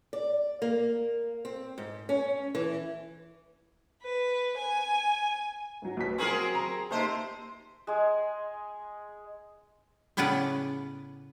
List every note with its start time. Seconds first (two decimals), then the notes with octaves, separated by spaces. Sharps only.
0.13 D5
0.62 A#3
1.45 C4
1.78 G#2
2.09 C#4
2.55 E3
4.03 B4
4.57 G#5
5.82 G#2 F#3
5.97 B1 B2 B6
6.18 F#3 C4 G#4 A#4 C#6
6.55 A#5
6.91 C3 A#3 D#4 C5 A5
7.87 G#3 G#4
10.17 A2 C#3 B3 C#4 D5 F#5